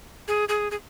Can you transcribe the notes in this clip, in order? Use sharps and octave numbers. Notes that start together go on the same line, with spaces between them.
G#4
G#4
G#4